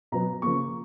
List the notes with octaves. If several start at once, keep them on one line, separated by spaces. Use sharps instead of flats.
B2 F#3 B3 A#5
C#3 F3 A#3 C#6